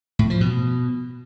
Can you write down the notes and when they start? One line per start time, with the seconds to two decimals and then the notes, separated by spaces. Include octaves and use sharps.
0.19 A2
0.30 F3
0.41 B2